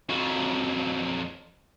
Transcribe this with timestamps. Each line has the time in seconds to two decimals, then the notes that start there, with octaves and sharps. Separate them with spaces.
0.09 F2 F#3